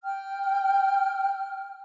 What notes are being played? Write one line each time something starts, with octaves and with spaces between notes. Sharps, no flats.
G5 F6